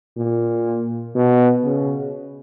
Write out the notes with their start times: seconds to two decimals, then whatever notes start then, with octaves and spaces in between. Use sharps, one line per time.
0.17 A#2
1.15 B2
1.65 C#3